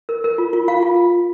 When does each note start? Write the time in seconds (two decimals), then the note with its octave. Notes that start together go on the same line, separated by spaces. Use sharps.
0.09 A#4
0.24 A#4
0.38 F4
0.53 F4
0.68 F4 F5
0.83 F4